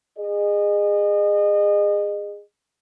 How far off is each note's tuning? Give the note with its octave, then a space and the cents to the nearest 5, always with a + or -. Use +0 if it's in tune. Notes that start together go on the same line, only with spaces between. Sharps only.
G#4 -20 D#5 -30